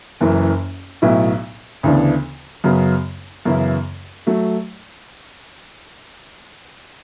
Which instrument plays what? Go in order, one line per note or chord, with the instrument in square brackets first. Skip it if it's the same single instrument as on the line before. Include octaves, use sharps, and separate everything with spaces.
[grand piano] F#1 F#2 E3
B1 A2 F#3 B3 E4
D2 C#3 E3 B3 D4
F#2 C#3 F#3 B3
F#2 C#3 E3 B3 E4
F#3 A3